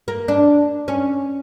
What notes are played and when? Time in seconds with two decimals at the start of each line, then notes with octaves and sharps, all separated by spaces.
0.08 A#3
0.28 D4
0.88 C#4